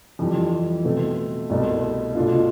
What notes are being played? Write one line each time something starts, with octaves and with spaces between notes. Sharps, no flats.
F2 E3 G3
B2 A3 C4
C2 B2 A3
B2 A3 D4 F4